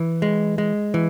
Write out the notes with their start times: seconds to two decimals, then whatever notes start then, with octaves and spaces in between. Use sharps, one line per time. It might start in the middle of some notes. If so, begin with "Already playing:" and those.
Already playing: E3
0.22 G#3
0.58 G#3
0.94 E3